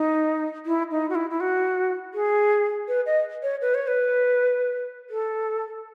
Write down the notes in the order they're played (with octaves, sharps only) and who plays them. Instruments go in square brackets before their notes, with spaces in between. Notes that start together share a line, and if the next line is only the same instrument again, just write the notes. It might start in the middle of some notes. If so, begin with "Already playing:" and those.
Already playing: [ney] D#4
E4
D#4
F#4
E4
E4
F#4
G#4
B4
D#5
C#5
B4
C#5
B4
A4